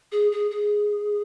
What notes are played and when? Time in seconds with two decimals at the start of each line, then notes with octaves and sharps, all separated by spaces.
0.12 G#4
0.32 G#4
0.51 G#4